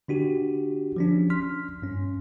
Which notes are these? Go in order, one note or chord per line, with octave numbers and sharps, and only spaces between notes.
D3 D4 F#4 G4
F3 C#4 D4
C6 F6 B6
G2 C#4